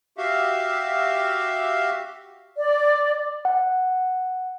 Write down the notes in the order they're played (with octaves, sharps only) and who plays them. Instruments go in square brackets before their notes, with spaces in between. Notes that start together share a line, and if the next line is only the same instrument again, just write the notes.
[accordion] F#4 G4 E5 F5
[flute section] D5
[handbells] F#5